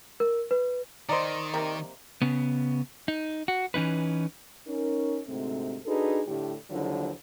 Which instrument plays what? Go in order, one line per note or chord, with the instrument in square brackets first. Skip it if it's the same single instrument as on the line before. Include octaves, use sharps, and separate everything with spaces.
[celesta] A#4
B4
[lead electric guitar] D#3 [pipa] C5 A#5 [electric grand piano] D5 D#5 C6
[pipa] C3 A#3
[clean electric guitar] C#3 B3
D#4
F#4
E3 C#4 D#4 B4
[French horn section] C#4 D#4 A#4
D2 G#2 C3 A3 C4
D4 D#4 F#4 G#4 A4 B4
A2 D3 G4
D#2 D3 D#3 F3 F#3 E4